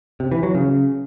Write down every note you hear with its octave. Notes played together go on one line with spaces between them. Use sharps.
C3
E3
F#3
C#3